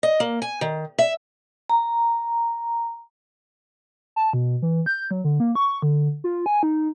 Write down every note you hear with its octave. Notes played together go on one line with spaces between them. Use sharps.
D#5
A#3
G#5
D#3
E5
A#5
A5
B2
E3
G6
F#3
D3
A#3
C#6
D3
F4
G#5
D#4